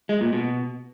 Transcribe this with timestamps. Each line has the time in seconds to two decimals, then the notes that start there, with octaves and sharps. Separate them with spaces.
0.09 G#3
0.21 A#2
0.33 B2